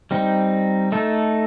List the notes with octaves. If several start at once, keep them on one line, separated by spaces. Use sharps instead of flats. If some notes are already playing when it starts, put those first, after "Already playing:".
G3 C4 D#4
A3 D#4 A4